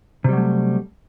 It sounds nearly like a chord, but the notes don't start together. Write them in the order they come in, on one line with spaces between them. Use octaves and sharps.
C3 G3 F#3 A3